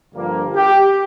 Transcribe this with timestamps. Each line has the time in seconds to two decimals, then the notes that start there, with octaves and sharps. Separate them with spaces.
0.14 G2 D3 F3 A#3
0.55 G4